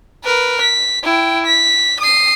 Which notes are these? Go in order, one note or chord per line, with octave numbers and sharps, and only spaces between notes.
A#4 B4
B6
E4 G5
B6
D#6 C7